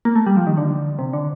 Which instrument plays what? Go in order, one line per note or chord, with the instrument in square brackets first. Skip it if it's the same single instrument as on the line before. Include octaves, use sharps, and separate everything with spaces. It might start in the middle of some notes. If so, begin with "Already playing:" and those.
[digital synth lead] A#3
A3
G3
F3
D#3
D3
C3
D3